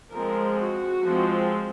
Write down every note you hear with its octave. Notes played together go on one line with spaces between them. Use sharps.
F3 G#3 C4 A#4
F#4
F3 G#3 C4